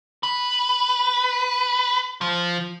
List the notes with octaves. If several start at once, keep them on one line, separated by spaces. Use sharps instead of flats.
B4
F3